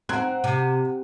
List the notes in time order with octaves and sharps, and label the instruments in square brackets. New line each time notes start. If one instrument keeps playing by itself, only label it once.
[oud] C4 [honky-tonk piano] F#5 A#5 F#6
[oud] C3